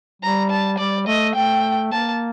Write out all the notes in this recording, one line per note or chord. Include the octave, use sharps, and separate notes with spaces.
G3 A#5
A5
G3 D5
A3 D#5
A3 G5
A#3 A5